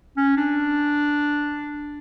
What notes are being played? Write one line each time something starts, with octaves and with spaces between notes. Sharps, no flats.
C#4
D4